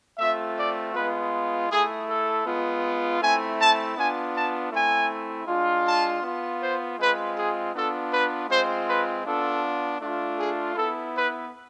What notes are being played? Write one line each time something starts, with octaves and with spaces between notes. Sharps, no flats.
A3 C4 F4 E5
D5
G#3 B3 F4 B4
A3 E4 G#4
A4
G#3 B3 F4
A3 C4 E4 G#5
A5
B3 D4 F4 G#5
A5
A3 C4 E4 G#5
G#3 D4 F4
A5
B3 F4
C5
G#3 C4 F4 B4
G#4
B3 D4 F4 A4
B4
G#3 C4 F4 C5
B4
B3 D4 F4 A4
A3 D4 F4
G#4
B3 E4 A4
B4